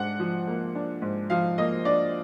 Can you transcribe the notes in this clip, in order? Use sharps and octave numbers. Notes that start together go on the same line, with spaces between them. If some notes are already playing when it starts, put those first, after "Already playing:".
Already playing: G#2 D4 F#5
F3
A#3
D4
G#2
F3 F5
A#3 D#5
D4 D5